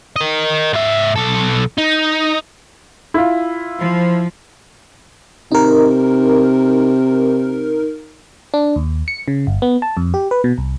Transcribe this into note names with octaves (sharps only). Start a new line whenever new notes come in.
A#4 D#5
G#2 E5
B1 A4
D#4
E4 F4
F3
C3 D#4 A#4
D4
D#2
C#7
C#3
G1
B3
A5
F2
G4
B4
B2
C2